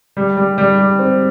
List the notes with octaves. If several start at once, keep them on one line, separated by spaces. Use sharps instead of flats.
G3
G3
G3
G3
C4